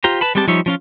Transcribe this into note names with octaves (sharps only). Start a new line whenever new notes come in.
F4 G4 C5 A#5
B4 A5 B5
G3 G#3 C4 G4 A5
F3 G3 D#4 C#5 E5
F3 C#4 F4